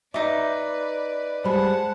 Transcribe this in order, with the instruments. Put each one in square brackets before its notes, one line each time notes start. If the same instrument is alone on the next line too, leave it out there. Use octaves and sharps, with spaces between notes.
[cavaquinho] D#4 D6 [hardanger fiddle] B4 D5 [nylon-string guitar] E5
[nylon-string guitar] G3 G#3 [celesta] C5 B5 [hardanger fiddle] F#5 A5